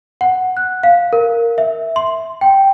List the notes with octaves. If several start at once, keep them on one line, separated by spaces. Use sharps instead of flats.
F#5
F#6
F5
A#4
E5
C6
G5